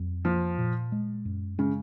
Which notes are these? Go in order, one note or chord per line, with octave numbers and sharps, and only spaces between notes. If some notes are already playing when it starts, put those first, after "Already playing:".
Already playing: F2 F#3
F3 A#3
A#2
G#3
F#2
C#3 G#3